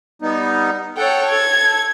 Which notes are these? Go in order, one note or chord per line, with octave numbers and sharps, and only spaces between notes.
G3 B3 D#4
A4 C#5 F#5 G5
A4 G#6